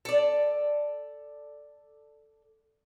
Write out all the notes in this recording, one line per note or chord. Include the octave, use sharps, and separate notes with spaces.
A4 D5